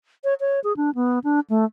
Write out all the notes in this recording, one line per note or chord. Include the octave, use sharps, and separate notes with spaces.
C#5
C#5
G#4
D4
B3
D4
A3